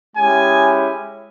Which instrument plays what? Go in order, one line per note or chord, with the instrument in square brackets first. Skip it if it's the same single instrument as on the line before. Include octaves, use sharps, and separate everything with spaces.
[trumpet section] G#3 C#4 E4 G4 G#5